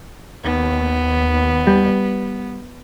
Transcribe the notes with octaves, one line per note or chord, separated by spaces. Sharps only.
D#2 B3
G3